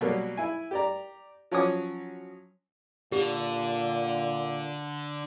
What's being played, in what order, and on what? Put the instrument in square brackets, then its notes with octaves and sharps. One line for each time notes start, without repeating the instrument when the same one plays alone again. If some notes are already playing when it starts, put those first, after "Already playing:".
[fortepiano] B2 F#3 G3 A#3
E4 G#5
G4 D5 A#5
F3 F#3 C#4 C#5 G#5 D#6
[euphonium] A#2 [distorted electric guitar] D3 [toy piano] G4